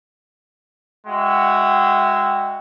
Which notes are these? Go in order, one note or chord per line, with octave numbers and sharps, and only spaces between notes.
G#3 F#4 E5 G5